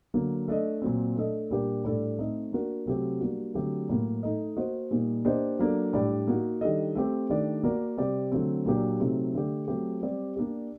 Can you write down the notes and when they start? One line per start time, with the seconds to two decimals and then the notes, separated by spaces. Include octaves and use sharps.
0.14 D3 F#3 A#3
0.48 A3 D4 A4 D#5
0.82 A#2 F#3 C4
1.16 A3 D4 A4 D#5
1.50 A#2 G3 D4 G4 A#4
1.85 A2 G3 D4 A4 D5
2.19 A3 C4 D#4 A4 D#5
2.52 A#3 D4 F#4 A#4
2.86 C3 F#3 A3 C4 G4
3.21 G3 A#3 D4 F#4
3.54 D3 F#3 A3 C4 G4
3.89 A2 F#3 A#3
4.23 A3 D#4 A4 D#5
4.56 A#3 F#4 C5 D#5
4.91 A#2 G3 A#3 D#4
5.25 A#3 D4 G4 C5 D#5
5.59 F#3 A#3 D4 A4
5.93 A2 G3 D4 G4 D5
6.27 A#3 D#4 F#4
6.61 D#3 G3 D4 A4 D#5
6.95 A3 C4 G4
7.29 D#3 A3 D4 G4 D5
7.63 A#3 F#4 A#4 D5
7.97 C3 G3 C4 G4 D5
8.32 D3 F#3 A3 C4
8.65 A#2 F#3 A#3 D4 G4
9.00 C3 F#3 A3 C4 D#4
9.34 D3 A3 D4 G4
9.68 F#3 A3 C4 G4
10.02 G3 C4 G4 D5
10.36 A#3 D4 G4 D5